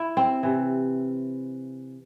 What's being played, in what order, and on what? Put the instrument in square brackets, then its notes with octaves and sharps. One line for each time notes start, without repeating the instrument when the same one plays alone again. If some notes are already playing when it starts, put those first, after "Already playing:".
Already playing: [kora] E4
C4
C3 E3